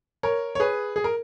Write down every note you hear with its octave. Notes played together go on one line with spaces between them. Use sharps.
A#4 C#5
C#5
G#4 B4
G#4
A#4